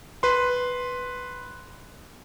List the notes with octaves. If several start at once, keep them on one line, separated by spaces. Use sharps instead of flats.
B4 C6